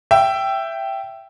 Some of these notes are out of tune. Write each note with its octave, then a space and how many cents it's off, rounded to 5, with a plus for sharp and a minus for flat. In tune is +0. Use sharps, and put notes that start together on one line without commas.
E5 +15 G5 -5